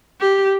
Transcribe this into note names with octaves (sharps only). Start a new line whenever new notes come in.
G4